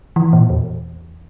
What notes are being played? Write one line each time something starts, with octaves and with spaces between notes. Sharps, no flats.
E3
A#2
E2